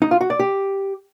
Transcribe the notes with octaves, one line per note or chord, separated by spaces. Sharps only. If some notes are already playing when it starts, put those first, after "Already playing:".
D#4
F4
F#4
D5
G4